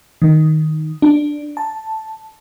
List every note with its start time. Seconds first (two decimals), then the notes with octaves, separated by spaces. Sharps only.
0.22 D#3
1.02 D4
1.57 A5